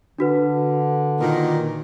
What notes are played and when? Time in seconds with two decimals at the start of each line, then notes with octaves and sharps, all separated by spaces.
0.18 D3 D4 F#4 B4
1.21 A#2 D#3